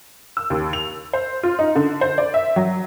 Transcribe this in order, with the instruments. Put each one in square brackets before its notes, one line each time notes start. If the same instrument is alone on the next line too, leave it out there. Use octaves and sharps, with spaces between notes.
[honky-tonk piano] E6
D#2
F7
C5
F4
D#4
D3
C5
D5
E5
F#3